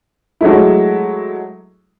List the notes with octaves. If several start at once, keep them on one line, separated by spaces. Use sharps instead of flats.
F#3 G#3 A3 E4